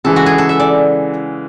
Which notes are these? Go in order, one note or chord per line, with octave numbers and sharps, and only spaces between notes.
C#3 E3 G#3 A4
F#4
G#4
A4
E5
D5